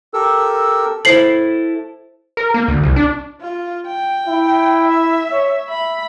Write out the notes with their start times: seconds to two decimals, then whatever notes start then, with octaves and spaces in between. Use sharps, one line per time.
0.14 G4 A4 A#4 E6
1.05 E4 A4 C5 C7 F#7
2.37 A#4
2.54 A#3
2.68 D2
2.83 C2
2.96 D4
3.41 F4
3.87 G5
4.27 E4
4.88 E5
5.32 C#5
5.69 E5 B5